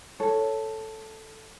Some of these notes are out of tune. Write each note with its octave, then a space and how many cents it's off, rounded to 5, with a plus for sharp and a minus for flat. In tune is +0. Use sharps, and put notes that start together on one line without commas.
A4 +0 C#5 +5